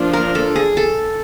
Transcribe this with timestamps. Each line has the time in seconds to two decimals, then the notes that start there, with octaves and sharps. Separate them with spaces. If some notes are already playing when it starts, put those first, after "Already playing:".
Already playing: F3 A#3 D4 F4
0.13 A#4
0.35 A4
0.56 G#4
0.77 A4